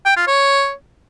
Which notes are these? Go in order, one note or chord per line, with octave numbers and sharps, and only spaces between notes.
G5
F4
C#5